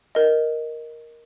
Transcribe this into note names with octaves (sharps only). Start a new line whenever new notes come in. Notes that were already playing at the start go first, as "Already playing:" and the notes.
A#4 D#5